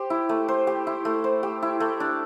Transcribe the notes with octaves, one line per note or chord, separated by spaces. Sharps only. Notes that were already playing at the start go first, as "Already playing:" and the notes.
Already playing: G4 C5
E4
A3
C5
G4
E4
A3
C5
G4
E4
A3
D4